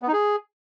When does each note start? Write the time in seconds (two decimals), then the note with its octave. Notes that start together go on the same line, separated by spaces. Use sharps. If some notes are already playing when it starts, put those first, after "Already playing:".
0.02 B3
0.08 D#4
0.13 G#4